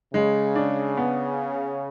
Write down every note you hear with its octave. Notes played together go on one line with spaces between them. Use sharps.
C#3 G#3
D4
B3